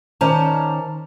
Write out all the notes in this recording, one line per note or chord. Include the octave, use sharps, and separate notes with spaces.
D#3 C#4 C5 D5 A5 A#5